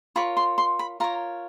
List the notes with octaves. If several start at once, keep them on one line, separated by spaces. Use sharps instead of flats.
F4 A#4 C#5 B5
C6
C6
B5
F4 A#4 C#5 A#5